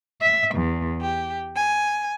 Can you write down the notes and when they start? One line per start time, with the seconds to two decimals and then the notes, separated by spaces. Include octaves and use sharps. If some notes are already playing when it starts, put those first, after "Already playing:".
0.22 E5
0.55 E2
1.01 G4
1.56 G#5